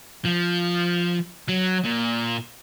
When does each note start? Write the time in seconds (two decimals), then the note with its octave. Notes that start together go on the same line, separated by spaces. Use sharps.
0.25 F3
1.48 F#3
1.84 A#2